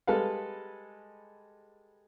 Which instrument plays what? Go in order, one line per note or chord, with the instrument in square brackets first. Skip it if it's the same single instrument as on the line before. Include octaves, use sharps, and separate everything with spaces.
[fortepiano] G3 G#3 A4 B4 F5